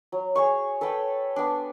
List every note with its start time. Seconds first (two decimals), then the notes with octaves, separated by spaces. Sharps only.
0.12 F#3
0.36 G#4 C#5 C#6
0.81 A4 B4 C#5 G5
1.36 B3 D4